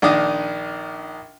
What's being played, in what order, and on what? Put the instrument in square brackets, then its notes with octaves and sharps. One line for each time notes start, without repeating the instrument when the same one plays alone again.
[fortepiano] A#1 D#3 D4 D#4 D6 D#6